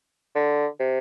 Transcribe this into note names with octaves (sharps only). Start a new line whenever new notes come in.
D3
C3